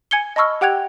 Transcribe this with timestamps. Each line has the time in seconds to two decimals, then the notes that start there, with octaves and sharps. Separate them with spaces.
0.11 G#5 G#6 C#7 G7
0.36 D#5 A5 B5 C#6 E6 F6
0.61 G4 F#5 G5 F#6 G#6 F7